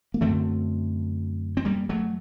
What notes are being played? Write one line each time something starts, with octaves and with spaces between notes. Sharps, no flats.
A#3
F#2 D3 A3 C4
C4
G3 A#3
F#3 A3